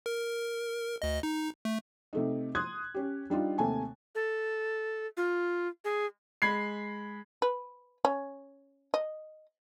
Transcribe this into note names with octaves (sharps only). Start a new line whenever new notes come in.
A#4
D2 D#5
D#4
A3
C3 A3 D#4
C6 D#6 F#6 G#6
C#4 G4
G3 D4 D#4 F4
D#2 C3 A3 G#5 A5
A4
F4
G#4
G#3 B5 G#6 C7
B4
C#4
D#5